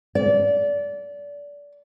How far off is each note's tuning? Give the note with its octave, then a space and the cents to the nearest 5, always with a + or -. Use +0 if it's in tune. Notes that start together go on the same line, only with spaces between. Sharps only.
D5 -25